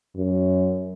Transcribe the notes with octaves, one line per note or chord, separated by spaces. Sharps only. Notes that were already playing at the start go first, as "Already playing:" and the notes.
F#2